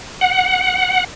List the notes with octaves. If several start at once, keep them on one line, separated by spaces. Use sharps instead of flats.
F#5